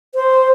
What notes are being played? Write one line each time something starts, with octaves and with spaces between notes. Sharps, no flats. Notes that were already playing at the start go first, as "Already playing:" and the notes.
C5